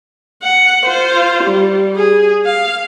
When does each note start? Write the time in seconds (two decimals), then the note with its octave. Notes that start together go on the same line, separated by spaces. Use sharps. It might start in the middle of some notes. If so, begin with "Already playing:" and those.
0.43 F#5
0.86 F4 C5
1.43 G3
1.96 G#4
2.45 F5